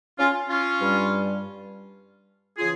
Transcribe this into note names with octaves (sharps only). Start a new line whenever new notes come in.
C#4 F4
C#4 F4
G2 G3
C#3 E3 F4 G#4